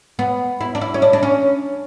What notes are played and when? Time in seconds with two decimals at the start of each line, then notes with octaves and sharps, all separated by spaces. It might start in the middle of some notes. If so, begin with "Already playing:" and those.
0.19 B3
0.61 E4
0.75 D4
0.81 E4
0.94 C#4
1.02 D4
1.13 D4
1.23 C#4